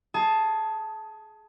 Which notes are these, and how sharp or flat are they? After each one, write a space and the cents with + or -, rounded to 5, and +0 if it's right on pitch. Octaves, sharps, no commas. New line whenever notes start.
G#4 +25 A5 +0 D#6 +10